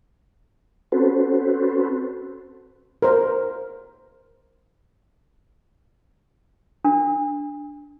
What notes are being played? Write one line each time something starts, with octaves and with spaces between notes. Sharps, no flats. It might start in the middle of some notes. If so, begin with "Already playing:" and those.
C4 C#4 F#4 A4 B4 C5
A#4 C5
D4